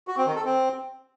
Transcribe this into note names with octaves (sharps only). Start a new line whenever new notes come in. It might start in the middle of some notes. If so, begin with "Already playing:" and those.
F#4
C4
D#3
A4
C4